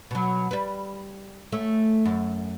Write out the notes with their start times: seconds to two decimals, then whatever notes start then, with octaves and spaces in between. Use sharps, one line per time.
0.11 B2 F#3
0.51 G3 B4
1.52 A3 C#4
2.05 F#2